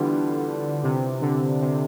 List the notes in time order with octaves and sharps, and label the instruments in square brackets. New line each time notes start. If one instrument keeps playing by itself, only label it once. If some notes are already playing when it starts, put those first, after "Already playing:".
Already playing: [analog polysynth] D3 [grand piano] E3 G3 B3 F4
[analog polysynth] C3
D3
C3